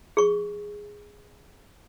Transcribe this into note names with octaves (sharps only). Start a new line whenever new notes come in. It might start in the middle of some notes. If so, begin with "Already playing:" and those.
G#4 C#6